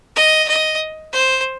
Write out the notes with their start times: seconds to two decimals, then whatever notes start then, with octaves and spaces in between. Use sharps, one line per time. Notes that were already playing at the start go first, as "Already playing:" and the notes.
0.16 D#5
0.48 D#5
1.13 C5